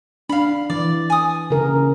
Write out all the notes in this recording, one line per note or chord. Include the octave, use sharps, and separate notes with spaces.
D4 F5 B5
E3 D5
G#5 D#6
C#3 A#4